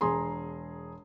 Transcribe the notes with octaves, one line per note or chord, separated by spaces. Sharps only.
E1 G#4 A#5 C6